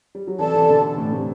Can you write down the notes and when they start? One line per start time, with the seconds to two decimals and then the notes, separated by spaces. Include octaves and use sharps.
0.15 G3
0.27 F#3
0.39 C3 E3 A4 D5 A5
0.54 C3 E3
0.69 B2 D3
0.98 A2
1.13 A2 C3